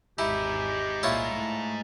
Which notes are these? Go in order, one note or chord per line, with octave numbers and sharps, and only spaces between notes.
G#1 E2 G#3 D#4 E4 G4
C2 A#2 E4 F4 C#5
A2 A3